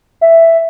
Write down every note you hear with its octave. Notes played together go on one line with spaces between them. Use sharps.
E5